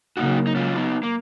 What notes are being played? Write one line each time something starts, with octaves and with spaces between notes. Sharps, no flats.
C#3 F#3 A#3 D#4 F#4
D#4
C#4 F4
B3 D#4
A#3